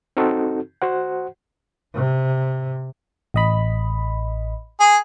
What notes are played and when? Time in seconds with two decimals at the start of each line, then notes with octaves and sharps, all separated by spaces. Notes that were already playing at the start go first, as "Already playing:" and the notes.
0.17 C4 D#4 F#4 A4
0.82 F#4 C5 F#5
1.94 C3
3.34 A1 D#5 B5
4.80 G#4